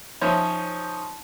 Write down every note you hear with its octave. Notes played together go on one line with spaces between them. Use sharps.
F3 C#4 D#4 C5 C#5 E5